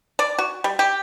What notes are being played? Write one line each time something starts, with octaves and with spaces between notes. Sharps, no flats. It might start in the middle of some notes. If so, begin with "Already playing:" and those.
D5
F#4
G3
G4